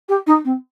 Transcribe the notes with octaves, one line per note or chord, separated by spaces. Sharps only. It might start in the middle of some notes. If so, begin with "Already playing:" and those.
G4
D#4
C4